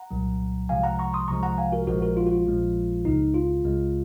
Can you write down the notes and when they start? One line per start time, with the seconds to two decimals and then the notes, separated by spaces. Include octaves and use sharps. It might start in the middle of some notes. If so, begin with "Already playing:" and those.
Already playing: F#5 A#5
0.11 C2 A#2 F#3
0.69 C2 C3 F3 G#3 F5 G#5
0.84 F#5 A#5
0.99 A#5 C#6
1.14 C6 D#6
1.28 C2 C3 F3 G#3 A#5 C#6
1.43 F#5 A#5
1.58 F5 G#5
1.72 F#4 A#4
1.87 A#1 A#2 F3 G#3 F#4 A#4
2.02 F#4 A#4
2.17 F4
2.27 F#4
2.31 F4
2.46 A#1 A#2 F3 G#3
3.05 C#2 C#3 G#3 D#4
3.34 F4
3.63 C#2 C#3 G#3